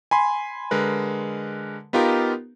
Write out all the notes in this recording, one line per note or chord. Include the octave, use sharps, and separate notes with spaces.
G#5 B5 C6
D3 G#3 A#4 B4
B3 D#4 F4 G4 A#4